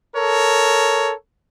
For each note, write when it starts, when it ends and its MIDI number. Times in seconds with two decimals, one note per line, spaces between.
0.16 1.14 69
0.16 1.14 70
0.16 1.14 73